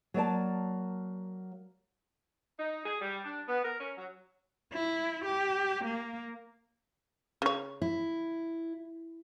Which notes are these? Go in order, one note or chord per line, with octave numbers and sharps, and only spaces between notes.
F#3 A#3 D5 A5
D#4
G#4
G3
D4
B3
A#4
C#4
F#3
E4
G4
A#3
C#3 C#5
E4